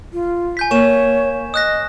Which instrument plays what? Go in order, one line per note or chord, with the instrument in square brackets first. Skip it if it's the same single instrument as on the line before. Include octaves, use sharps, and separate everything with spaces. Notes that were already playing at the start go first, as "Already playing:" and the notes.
[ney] F4
[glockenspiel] G#5 G6 B6
[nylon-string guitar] A#3 [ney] C#5 [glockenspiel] C#6 E7
[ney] D#5 [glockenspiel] D#6 F#6 A#6